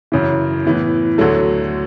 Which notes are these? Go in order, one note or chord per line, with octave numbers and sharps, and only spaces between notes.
F#2 C#3 E3
A2 E3 B3
D2 D3 F#3 A3